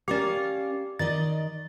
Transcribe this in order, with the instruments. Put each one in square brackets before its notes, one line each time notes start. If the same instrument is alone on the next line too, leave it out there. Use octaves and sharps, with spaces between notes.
[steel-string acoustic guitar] C#4 A#4 F5 [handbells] G4 D5
[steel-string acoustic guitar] D#3 D5 D#5 [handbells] A6